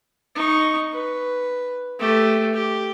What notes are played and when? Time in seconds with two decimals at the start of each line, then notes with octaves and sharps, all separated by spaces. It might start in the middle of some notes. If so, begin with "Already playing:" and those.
0.35 D#4 C#6
0.93 B4
1.99 A3 G4
2.54 G4